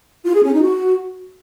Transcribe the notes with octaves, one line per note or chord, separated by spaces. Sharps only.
F4
G#4
C#4
D#4
F#4